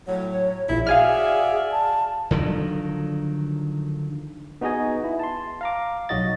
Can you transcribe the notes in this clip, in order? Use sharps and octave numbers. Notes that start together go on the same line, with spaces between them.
A2 F#3 C#5
A#1 E4
F#4 G#4 D5 E5 F5 G#5 F6
A5
D3 D#3 F3 F#3
B3 D#4 F#4 G#4 D#5 G#5
E4
A5 C6
F5 A#5 D6
B1 F#3 D#4 F#4 D#5 A6